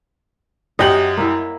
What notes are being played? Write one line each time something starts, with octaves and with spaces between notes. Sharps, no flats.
F#2 G4 D#5 F#5 G5 F#7
A#3 E4